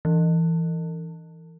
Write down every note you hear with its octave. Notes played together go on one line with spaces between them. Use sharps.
E3